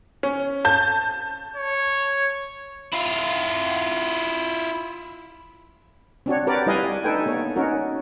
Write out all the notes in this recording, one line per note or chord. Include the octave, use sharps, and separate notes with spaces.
C#4
A5 G6
C#5
E4 F4
C4 D4 F#4 C#5
F#4 G4 A#4 B4 D5
G3 E4 B4 D#5 F5 G#5
D4 D#4 A4 B4 G5 G#5
A#3 B3 C#5
C#4 D#4 F#4 A#4